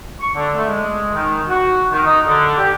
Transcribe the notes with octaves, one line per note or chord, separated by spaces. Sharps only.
C#6
D3
A3
G#3
D#3
F#4
D#3
D#4
D3
G4